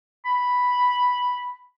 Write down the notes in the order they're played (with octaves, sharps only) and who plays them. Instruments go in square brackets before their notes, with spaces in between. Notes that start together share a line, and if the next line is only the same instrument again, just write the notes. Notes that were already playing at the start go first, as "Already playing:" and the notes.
[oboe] B5